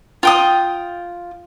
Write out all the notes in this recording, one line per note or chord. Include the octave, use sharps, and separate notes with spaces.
F4 G5 D#6